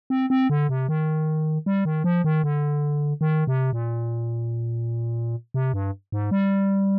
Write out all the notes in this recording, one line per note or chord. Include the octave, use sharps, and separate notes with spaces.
C4
C4
D3
C3
D#3
G3
D#3
F3
D#3
D3
D#3
C3
A#2
C3
G2
G#2
G3